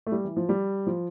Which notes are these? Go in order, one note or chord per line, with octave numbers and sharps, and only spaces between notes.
A3
G3
E3
F3
G3
F3